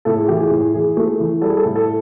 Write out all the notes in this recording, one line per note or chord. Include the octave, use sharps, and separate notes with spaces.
A2 A4
G#4
E3 G4
G#4
A2
E3 G#4
A3
E3
G3 A4
G#4
A4
A2
A4